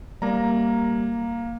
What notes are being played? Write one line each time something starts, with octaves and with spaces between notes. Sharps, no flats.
G3 A#3 A#5